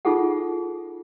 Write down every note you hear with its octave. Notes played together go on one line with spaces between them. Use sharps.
D#4 F4 G#4 A4 F#5